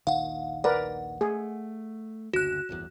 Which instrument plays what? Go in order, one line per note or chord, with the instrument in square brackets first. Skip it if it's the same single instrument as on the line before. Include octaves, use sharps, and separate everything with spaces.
[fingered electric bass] A#1 D#2 D#3 [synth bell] F5 F#5
[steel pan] A#4 B4 D5 [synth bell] F#5
[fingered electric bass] A3 [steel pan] G#4
[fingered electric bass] F#1 D2 [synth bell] F#4 F#6
[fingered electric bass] D1 G1 E2